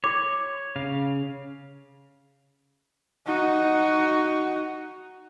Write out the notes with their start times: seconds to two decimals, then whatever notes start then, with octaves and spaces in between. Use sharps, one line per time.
0.04 F#4 C#5 D6
0.76 C#3 F5
3.26 D#4 F#4